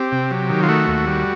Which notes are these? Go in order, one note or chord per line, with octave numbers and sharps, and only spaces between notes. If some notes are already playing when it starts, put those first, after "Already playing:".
Already playing: C4 G4
C3
F#3
D#3
F4
A3 F#4
D#2
G3